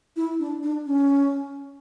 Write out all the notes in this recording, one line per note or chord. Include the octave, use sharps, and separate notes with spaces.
E4
D4
D4
C#4